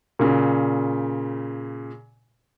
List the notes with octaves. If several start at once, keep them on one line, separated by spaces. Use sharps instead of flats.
A#2 C#3